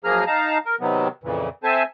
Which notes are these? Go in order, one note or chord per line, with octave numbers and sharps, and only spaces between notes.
F#2 F3 A#3 G#4 A#5 F6
D#4 F5 A5 A#5
A#4
C3 D#3 F#3 B3
F2 A#2 C#3 E3
C4 A4 C5 E5 G#5 A5